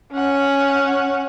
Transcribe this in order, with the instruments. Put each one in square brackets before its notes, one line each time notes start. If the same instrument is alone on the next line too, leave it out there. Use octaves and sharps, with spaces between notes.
[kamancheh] C#4 F#5